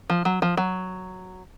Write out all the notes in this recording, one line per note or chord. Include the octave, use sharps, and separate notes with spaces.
F3
F#3
F3
F#3